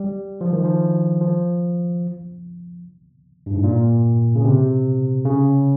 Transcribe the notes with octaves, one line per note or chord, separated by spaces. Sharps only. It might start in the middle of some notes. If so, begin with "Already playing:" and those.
Already playing: G3
F3
D#3
F3
F3
G2
G#2
A#2
C#3
C3
C#3